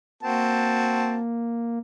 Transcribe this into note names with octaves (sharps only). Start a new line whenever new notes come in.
A#3 C4 F#4 A5